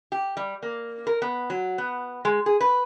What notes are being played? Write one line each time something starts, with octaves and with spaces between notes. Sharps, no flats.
G4
G3
A#3
A#4
B3
F#3
B3
G#3
G#4
B4